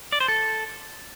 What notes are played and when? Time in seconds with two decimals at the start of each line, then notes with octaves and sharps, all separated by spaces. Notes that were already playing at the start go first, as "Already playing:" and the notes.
0.12 D5
0.20 C5
0.28 A4